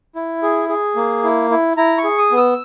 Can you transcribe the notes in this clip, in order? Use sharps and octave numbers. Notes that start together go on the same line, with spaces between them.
E4
G#4
G#4
A#3
E4
E4
E4 A#5
C#6
G#4
D#6
B3
E6